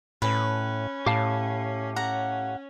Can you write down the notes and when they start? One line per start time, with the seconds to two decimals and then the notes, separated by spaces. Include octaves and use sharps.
0.22 A2 C#4 B4
1.06 A2 G4 F5 A5
1.96 C#4 F#5 A#5